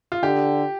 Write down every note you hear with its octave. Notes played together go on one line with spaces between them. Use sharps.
F4
D3 G4